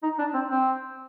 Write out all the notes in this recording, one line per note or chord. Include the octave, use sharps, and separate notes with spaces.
D#4
D4
C4
C4